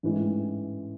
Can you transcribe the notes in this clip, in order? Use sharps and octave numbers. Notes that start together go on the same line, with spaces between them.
A1 G#2 E3